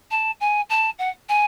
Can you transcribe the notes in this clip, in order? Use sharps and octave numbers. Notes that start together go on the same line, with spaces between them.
A5
G#5
A5
F#5
G#5